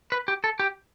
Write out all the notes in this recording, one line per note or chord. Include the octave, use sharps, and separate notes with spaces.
B4
G4
A4
G4